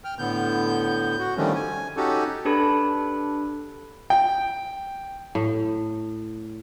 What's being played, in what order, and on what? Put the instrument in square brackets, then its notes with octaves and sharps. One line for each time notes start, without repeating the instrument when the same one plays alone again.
[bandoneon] G5 F6
A2 D3 B3 G6
F#4
D3 D#3 F3 G3 A3 C#4
G#5
C#4 D#4 F#4 G4 A4
[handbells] D4 G4 A4 B4 B5
[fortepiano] G5
[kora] A2